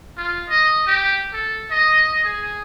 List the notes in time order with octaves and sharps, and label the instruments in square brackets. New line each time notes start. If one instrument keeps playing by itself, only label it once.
[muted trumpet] F4
D#5
G4
A4
D#5
G#4